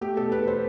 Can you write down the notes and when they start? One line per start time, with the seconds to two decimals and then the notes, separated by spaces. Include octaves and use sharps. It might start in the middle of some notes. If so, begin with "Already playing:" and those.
0.01 A3 G4
0.17 B2 A4
0.32 E2 B4
0.47 C5